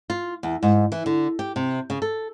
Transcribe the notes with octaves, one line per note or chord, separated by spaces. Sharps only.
F4
E2
G#2
E3
D3
G4
C3
C#3
A4